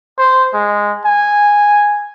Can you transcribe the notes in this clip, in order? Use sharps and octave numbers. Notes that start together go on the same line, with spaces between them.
C5
G#3
G#5